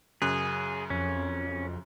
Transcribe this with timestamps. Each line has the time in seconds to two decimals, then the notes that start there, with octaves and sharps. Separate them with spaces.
0.22 F#2 C#3 G#4 F#6
0.90 F2 C#4